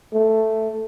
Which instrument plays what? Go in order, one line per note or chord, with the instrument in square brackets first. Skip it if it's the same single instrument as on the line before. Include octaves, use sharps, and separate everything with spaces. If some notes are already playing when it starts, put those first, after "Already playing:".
[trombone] A3